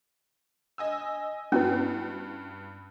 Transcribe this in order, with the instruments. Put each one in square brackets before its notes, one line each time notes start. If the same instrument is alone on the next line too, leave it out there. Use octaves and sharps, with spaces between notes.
[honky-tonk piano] D#5 G#5 E6
[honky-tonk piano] G2 [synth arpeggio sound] B3 F#4 B4 [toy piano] C#4 E4